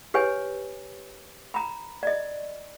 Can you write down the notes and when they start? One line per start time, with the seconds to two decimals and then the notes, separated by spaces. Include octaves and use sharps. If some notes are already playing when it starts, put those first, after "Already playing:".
0.14 G4 B4 C#5 G#5
1.54 A#5 B5
2.03 D5 D#5